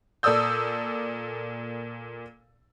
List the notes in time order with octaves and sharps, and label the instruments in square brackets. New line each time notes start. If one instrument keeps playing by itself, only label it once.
[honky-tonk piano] A#2 A4 D5 D#6 E6 G6